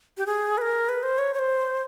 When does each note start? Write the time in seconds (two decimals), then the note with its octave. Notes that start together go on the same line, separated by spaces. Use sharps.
0.18 G4
0.26 G#4
0.58 B4
0.62 A#4
0.89 B4
1.03 C5
1.18 C#5
1.34 C#5
1.39 C5